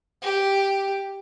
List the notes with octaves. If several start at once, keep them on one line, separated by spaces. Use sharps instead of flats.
G4